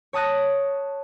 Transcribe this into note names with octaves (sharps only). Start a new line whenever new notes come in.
C#5 A5 D#6 F#6 A#6